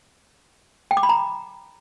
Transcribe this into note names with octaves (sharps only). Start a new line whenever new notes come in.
G5
D6
B5
A#5